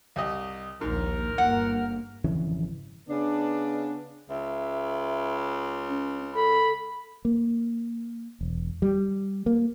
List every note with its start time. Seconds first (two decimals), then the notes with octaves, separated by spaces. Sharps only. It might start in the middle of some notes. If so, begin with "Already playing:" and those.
0.16 C2 G4 D#5
0.81 A#1 D#2 G#2 A#4
1.38 G1 A#3 F#5
2.24 G#1 F2 C#3 E3
3.09 C#3 B3 D4
4.29 C#2 E5
5.89 C#4
6.35 A4 B5
7.25 A#3
8.41 E1
8.82 G3
9.46 A#3